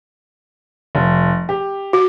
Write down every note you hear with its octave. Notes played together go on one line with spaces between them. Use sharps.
F1
G4
F#4